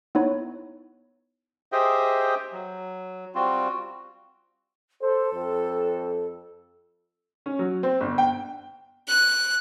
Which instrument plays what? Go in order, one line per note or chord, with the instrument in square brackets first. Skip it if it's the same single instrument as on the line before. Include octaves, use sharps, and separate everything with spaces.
[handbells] B3 D#4 E4 C#5
[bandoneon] G4 G#4 C5 D#5 E5 G5
F#3
G3 C4 F4 F#4
[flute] A4 [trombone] C5
[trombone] F2
[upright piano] C#4
F#3
C4
G1
G5
[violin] F#6